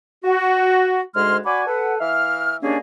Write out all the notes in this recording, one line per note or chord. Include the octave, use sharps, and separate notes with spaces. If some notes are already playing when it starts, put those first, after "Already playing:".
F#4
D2 G#2 G#3 C6 F6
F#4 D5 G#5 B5 D6
A4 B4 F#5
E3 E5 F5 F6
D#3 G3 A#3 C#4 D4 G#4